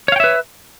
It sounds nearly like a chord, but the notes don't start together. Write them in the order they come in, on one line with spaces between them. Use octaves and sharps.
C#5 F5 G5 E5 B4